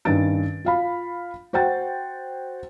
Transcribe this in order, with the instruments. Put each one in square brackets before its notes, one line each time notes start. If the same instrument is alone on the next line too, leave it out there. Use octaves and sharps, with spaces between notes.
[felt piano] G2 D#3 C#4 A6 D7
F4 F5 B5
F#4 C5 F#5 G5 A6